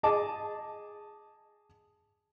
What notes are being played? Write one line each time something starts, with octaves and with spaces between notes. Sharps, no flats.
G#4 D#5 A5 D6